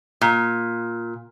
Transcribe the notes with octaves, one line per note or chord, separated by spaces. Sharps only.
A#2